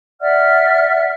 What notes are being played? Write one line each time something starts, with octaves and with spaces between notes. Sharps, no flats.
D5 E5 F#5 F6